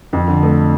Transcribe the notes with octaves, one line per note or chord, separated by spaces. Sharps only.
F2
D3
A3